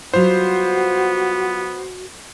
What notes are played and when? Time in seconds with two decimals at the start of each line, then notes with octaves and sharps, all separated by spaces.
0.14 F#3 G3 B3 F4 F#4 C5